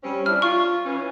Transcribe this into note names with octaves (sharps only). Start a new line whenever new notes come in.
G3 C4 C#4
D4 E4 F6
F4 C#6 F6
E3 C#4